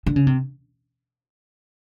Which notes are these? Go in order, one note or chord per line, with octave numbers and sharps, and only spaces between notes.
D3
C#3
C3